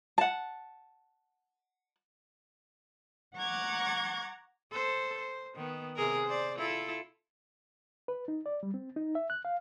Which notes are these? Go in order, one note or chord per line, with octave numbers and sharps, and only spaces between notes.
F#5 A5
F#5 A#5 C#6 D6 F#6 G#6
A4 C5
C5
D#3 B3
C3 G#4 A#4
C5 D5
E4 F4 A4
B4
D#4
D5
G3
C4
D#4
E5
F#6
F5